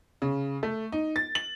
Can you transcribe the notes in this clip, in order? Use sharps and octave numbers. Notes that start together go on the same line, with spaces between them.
C#3
A3
D#4
A6
F#7